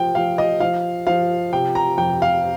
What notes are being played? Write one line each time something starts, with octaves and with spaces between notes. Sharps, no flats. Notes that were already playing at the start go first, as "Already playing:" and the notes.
Already playing: F3 G5
F3 F5
D#5
F3 F5
F3 F5
C3 G5
A#5
F2 G5
F5